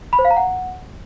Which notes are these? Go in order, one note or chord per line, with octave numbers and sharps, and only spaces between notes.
B5
C5
F5
A#5
F#5